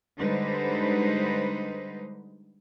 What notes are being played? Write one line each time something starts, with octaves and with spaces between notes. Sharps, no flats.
D3 G3 G#3 D#4 B4 C5